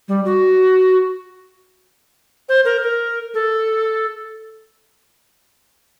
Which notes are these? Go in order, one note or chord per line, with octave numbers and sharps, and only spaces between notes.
G3
F#4
C5
A#4
A#4
A4